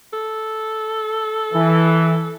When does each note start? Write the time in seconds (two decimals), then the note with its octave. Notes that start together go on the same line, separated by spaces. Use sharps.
0.13 A4
1.54 E3